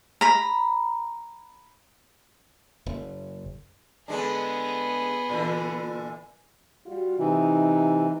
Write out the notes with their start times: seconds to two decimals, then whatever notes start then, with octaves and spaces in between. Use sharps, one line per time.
0.21 A#5 B5
2.86 F#1
4.08 D3 G#3 B3 D4 G#4
5.29 A#2 D3 E3
6.86 G3 F4 F#4
7.19 C3 E3 D#4